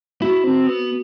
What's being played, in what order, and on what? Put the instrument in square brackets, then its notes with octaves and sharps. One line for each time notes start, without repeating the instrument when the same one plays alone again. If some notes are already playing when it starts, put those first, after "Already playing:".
[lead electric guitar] E4 [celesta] F#4
[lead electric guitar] C4
B3